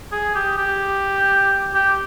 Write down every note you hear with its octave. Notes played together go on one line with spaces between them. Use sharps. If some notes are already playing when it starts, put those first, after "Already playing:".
G#4
G4
G4
G4